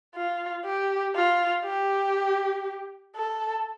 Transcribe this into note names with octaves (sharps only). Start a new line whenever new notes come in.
F4
G4
F4
G4
A4